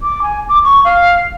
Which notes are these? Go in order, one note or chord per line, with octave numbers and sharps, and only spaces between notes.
D6
G#5
D6
C#6
F5